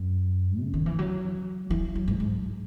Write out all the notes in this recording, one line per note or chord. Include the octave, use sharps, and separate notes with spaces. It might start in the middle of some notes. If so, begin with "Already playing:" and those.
Already playing: F#2
C#3
D#3
E3
F#3
E3
F#3
G#2
G#2